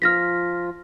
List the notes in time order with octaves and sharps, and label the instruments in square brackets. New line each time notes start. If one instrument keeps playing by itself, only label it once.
[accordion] F3 F4 [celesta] F6 A#6 B6